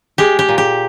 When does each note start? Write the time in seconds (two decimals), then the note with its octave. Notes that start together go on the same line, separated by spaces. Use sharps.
0.18 G#3 G4
0.39 G4
0.49 A#2
0.58 G4